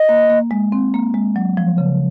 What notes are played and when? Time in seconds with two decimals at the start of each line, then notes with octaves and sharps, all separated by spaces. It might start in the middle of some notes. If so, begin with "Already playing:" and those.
Already playing: D#5
0.09 A#3
0.30 A#3
0.51 G#3
0.72 C4
0.94 A#3
1.14 G#3
1.36 F#3
1.57 F3
1.78 C#3